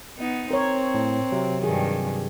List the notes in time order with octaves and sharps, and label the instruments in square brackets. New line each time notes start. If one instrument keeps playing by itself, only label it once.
[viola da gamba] B3 D#4
[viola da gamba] C4 [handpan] A#4 C#5
[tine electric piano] A2
C3 F#3
[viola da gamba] G2 D#3 [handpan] G#4